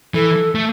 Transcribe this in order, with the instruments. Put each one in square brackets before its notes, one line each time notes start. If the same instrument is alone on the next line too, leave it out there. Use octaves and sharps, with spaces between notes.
[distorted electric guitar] E3 [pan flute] A4
[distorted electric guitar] A3